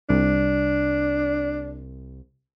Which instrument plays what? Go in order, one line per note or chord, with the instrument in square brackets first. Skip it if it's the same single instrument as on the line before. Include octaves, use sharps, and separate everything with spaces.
[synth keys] C2 [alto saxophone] D4